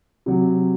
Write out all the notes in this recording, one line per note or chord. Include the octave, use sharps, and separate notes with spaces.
C3 F#3